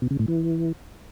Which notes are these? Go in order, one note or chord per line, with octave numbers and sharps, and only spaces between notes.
B2
C#3
A2
E3